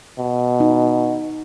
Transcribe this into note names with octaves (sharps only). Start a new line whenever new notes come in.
B2
D#4